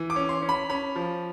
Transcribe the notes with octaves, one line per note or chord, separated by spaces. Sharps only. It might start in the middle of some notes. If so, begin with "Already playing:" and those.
Already playing: E3
D6
C#4
C6
C#4
B5
C#4 B5
F3